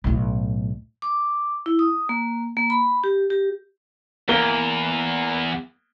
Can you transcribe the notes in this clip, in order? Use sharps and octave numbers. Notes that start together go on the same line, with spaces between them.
B1 A2
D6
E4
D#6
A#3
A#3
B5
G4
G4
E2 A#3 G7